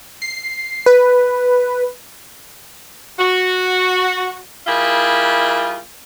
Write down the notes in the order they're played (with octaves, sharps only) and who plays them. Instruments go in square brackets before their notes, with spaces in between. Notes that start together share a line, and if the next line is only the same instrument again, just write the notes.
[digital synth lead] C7
B4
[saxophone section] F#4
G3 E4 F4 G#4 A#4 E5